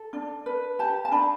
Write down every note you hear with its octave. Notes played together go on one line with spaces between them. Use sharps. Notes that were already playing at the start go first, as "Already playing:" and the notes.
Already playing: A4
D4
B4
G4 A5
A5
D4 B5